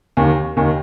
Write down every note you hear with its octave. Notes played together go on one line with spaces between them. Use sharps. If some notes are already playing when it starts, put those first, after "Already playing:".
D#2 D#3
D#2 D#3